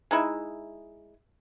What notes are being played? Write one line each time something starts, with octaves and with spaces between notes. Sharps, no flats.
G#3 D#4 E4